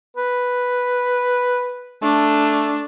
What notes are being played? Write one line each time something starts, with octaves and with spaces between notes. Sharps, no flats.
B4
A3 D4